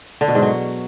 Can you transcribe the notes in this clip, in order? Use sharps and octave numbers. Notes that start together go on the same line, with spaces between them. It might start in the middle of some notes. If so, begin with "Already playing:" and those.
D3
B2
G#2
F#3